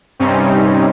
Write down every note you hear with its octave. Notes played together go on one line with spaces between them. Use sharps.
G2 C3 G3 C4 C#4 D#4